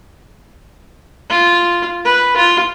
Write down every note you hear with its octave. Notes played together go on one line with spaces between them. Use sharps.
F4
B4
F4